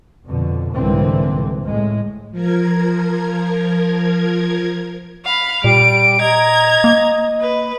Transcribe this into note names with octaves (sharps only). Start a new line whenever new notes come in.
F2 B2 D3
C2 G#2 D3 E3 A#3 C4
A2 G#3
F3 A#4 G#6
F5 B5
A#2 G3 D7
D#5 A#5 G#6
A#3
B4